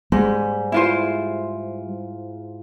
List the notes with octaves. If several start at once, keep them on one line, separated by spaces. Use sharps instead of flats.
G#2 G3
E4 F4 C5